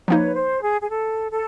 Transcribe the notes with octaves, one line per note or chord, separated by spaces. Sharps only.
F3 A#3 D#4 B4 C#5
C5
G#4
G#4
A4
A4